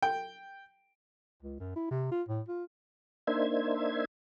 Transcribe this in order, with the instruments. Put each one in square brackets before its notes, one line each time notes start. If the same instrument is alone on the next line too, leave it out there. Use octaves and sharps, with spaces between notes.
[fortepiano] G5
[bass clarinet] C#2
F#2
E4
C3
F4
A2
F4
[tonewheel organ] A#3 D4 D#4 C5 E5 G#6